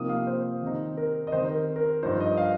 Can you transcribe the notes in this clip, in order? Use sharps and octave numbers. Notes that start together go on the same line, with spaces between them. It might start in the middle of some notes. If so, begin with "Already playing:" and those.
Already playing: C3 F3 A#3 D#4 D#6
F5
C5
D#3 C4 D#4
A#4
D#5
D#3 C4 D#4 C5
A#4
A#4
G2 F3 D#4 C5
D#5
F5